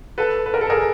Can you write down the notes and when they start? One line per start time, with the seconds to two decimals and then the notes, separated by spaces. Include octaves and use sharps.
0.18 A4 B4
0.46 B4
0.54 A#4
0.61 A4
0.70 G#4 A#4